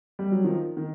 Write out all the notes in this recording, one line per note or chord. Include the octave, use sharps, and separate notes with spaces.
G3
F#3
D#3 F3
D#3